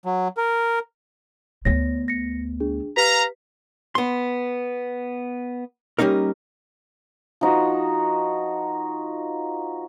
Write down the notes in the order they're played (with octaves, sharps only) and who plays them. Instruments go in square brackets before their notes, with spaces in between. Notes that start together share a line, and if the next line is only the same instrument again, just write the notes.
[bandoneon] F#3
A#4
[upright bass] D2 B3 [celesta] C#5 A#6
[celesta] A#6 C#7
D4 G#4
[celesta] G4 B4 B6 [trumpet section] F5 A#5
[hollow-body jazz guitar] B3 C6
G3 A#3 C#4 D#4 A#4
[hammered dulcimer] F3 D#4 F#4